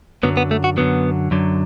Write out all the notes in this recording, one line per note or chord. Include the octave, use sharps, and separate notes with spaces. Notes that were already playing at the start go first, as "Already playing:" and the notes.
F#2 D3 F#3 B3
B3
A3
F#4
F#2 D3 F#3 B3
F#2 D3 F#3